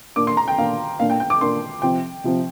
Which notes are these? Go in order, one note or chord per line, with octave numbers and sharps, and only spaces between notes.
A#2 A#3 D4 D6
C6
A#5
G5
A#2 A#3 D4 F5
A#2 A#3 D4 F5
G5
G5
D6
A#2 A#3 D4 C6
C3 F3 C4 G5
C3 F3 C4